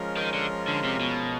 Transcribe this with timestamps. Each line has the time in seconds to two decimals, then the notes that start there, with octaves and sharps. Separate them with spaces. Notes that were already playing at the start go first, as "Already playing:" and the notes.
Already playing: F3 G#3 C#4 F4 A#4
0.17 D#3
0.34 D3
0.68 D3
0.84 C3
1.00 B2